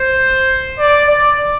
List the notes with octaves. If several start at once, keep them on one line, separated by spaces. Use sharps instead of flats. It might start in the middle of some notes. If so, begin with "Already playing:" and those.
Already playing: C5
D5
D5